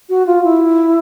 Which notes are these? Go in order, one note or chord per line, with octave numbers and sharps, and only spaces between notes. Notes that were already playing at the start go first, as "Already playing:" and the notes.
F#4
F4
E4